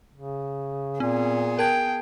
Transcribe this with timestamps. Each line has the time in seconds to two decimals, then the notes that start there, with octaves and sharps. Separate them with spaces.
0.14 C#3
1.00 A#2 B3 C4 G#4
1.59 A#4 G5 A5 G#6